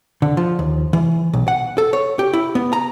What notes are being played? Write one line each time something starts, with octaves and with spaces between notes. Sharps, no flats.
D3
F3
D#2
E3
B1
F#5
A4
C#5
G4
E4
B3
A#5